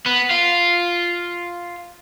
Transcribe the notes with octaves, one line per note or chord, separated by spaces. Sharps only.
B3
F4